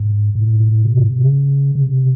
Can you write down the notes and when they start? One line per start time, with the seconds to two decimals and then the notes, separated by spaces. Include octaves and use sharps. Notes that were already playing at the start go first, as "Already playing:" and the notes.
Already playing: G#2
0.35 A2
0.60 A2
0.85 C3
0.97 G#2
1.09 C3
1.22 C#3
1.75 C#3
1.83 C3